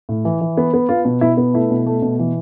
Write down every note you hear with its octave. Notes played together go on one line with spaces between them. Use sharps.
A2
E3
E3
B3
B3
B3 F4
B2
B2 E4
B3
A3 E4
B2
A3
B2
E3